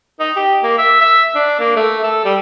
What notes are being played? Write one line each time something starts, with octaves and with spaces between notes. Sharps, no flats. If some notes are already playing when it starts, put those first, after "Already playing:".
D#4
G4
A#3
E5
E5
D4
A#3
A3
A4
G3